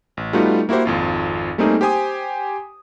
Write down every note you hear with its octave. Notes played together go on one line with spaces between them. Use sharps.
A1
G3 A3 B3 D#4 F4 F#4
A#3 E4 F#4 G4 C5
G#1 F2 F4
G3 A3 A#3 C4 D#4 G#4
G4 C5 G#5 D#6